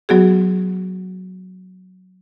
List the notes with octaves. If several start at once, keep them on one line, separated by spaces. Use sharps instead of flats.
F#3 B3 F#4 G#4